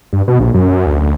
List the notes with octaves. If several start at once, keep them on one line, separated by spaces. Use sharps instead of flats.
G2
B2
A#1
F#2
D2
D2